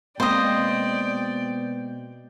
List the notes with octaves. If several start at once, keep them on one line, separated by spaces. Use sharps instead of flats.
B2 G#3 A#3 C4 C5 D5 D#5 G5